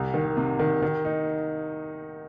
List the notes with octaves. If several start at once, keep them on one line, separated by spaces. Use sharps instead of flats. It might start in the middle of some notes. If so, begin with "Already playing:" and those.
Already playing: C2
D#3
C3
D#3
D#3
D#4